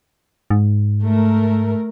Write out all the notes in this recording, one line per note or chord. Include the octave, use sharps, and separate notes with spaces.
G#2
A3 A#4